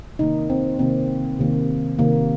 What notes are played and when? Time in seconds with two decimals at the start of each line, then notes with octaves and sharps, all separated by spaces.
0.19 C3 D#3 A#3 D#4
0.50 C4
0.79 C3 D#3 A#3 C4
1.39 C3 D#3 A#3
1.98 C3 D#3 A#3